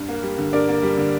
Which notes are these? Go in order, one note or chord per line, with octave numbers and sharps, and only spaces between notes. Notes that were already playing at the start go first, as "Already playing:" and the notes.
Already playing: G2
A#3
G3
D3
G2 A#4 D5
A#3
G3
D3